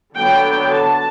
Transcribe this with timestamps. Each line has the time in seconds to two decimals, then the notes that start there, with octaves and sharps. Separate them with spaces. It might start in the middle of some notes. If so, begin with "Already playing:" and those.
0.15 D3 F#3 B3 G5
0.70 A5